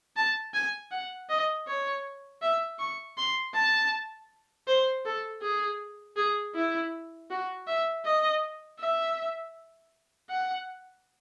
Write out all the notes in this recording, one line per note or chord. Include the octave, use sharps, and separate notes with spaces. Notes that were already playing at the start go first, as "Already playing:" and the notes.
A5
G#5
F#5
D#5
C#5
E5
C#6
C6
A5
C5
A4
G#4
G#4
E4
F#4
E5
D#5
E5
F#5